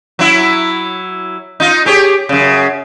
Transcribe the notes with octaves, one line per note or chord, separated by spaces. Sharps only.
F#3 E4
D#4 F4
G4 G#4 C#5
F#2 C#3